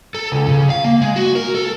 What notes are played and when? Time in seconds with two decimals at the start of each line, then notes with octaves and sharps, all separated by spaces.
0.15 A4
0.32 C#2
0.49 C#3
0.70 F5
0.84 A#3
1.01 G#3
1.16 F#4
1.35 A#4
1.55 A4